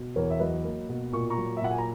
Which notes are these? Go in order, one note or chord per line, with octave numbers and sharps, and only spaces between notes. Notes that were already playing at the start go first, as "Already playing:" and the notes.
Already playing: B2
E2 A#4 C#5
E5
F#3 B4 D#5
A#3
B2
A#2 C#6
A#5 C#6
F#3
E5
A#2 F#5
G#5
A#5